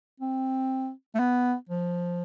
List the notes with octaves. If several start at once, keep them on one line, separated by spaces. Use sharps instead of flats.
C4
A3
B3
F3